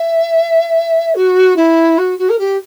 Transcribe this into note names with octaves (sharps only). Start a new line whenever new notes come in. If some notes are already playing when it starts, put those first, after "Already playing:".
Already playing: E5
F#4
E4
F#4
F#4
A#4
G4